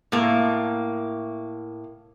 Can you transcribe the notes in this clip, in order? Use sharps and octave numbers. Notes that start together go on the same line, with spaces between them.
A2 A#3